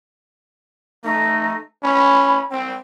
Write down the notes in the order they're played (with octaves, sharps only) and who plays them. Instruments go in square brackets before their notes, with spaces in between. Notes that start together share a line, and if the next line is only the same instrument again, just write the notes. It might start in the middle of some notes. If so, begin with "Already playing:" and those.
[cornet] A3 [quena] D#4
[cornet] C#4 [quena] B5
[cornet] C4 [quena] G5